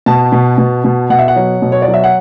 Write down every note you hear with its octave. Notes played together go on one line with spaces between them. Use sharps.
B2 A5
B2
B2
B2
B2 F#5
E5
F#5
F#3
B2
C#5
D5
F#3
E5
F#5